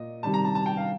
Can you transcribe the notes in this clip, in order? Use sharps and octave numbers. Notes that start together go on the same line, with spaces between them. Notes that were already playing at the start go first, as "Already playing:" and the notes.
Already playing: A#2 D#5
C3 D#3 G3 A5
A#5
A5
A5
G5
F5